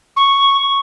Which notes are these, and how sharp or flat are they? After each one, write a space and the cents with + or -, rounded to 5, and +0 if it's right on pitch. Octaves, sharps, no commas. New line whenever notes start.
C#6 -5